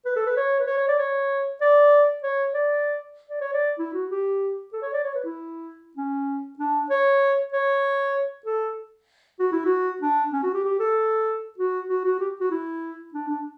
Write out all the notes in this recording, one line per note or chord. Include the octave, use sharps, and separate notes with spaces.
B4
A4
B4
C#5
B4
C#5
C#5
D5
C#5
D5
C#5
D5
D5
C#5
D5
E4
F#4
G4
A4
C#5
D5
C#5
B4
E4
C#4
D4
C#5
C#5
A4
F#4
E4
F#4
D4
C#4
F#4
G4
G4
A4
F#4
F#4
F#4
G4
F#4
E4
D4
D4